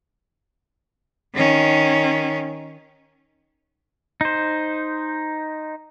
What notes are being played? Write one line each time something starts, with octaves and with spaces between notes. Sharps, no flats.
D#3 C#4
D#4 C5